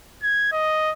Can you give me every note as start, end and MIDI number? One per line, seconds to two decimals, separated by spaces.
0.23 0.49 92
0.52 0.92 75